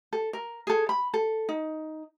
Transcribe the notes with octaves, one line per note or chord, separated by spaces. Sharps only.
A4
A#4
G#4 A4
B5
A4
D#4